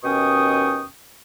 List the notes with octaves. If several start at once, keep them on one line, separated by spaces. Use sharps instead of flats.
D#2 B2 C#4 G5 C#6 D#6